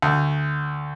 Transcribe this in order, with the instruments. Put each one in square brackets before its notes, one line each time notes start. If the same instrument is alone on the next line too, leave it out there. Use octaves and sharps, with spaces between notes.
[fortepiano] D2